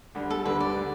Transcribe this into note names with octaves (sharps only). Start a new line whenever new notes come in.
D2 D3 G3
A4
D2 D3 G3 B4
D5
D3 G3